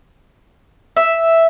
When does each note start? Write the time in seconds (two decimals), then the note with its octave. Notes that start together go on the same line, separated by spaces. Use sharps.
0.97 E5